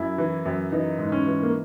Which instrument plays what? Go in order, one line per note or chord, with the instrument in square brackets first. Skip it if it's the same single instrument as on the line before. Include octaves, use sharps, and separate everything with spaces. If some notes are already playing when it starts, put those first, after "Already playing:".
Already playing: [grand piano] F#2 E4
E3
F#2
E3 D#4
G#2
C#4
E3
A#3